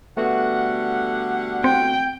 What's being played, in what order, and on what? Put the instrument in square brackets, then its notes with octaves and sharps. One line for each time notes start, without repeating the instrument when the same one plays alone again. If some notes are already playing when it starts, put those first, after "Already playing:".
[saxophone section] D3 G3 F#5 [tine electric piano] A3 B3 F#4
[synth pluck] C4 [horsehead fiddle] G5